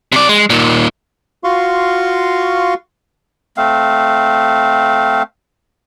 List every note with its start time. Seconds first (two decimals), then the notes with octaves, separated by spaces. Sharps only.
0.12 C3 D5
0.29 G#3
0.50 A#2 D#3
1.44 F4 F#4 F5 C6 C#6
3.57 A3 C4 F5